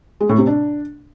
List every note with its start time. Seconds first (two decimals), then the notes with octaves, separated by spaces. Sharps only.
0.21 G#3
0.29 A2
0.38 C3
0.47 D4